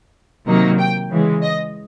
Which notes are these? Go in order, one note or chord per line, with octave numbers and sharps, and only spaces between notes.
C3 D#3 F#3 A#3 D#4
G5
C#3 E3 G#3
D#5